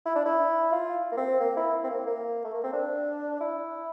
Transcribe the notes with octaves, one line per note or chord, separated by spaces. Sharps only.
E4
D4
E4
F4
A#3
C4
A#3
E4
C4
A#3
A#3
A3
A#3
C4
D4
E4